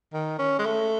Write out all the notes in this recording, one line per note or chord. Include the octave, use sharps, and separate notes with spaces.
D#3
C#4
G#3
A3